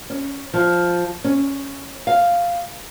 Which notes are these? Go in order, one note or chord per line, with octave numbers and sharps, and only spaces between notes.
C#4
F3
C#4
F5